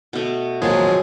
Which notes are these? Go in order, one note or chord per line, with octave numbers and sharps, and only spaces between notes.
B2 A3
G#1 A#2 F3 F#3 G#3 G#4